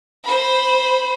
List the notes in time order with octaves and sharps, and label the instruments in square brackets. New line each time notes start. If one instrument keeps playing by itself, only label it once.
[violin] C5 B5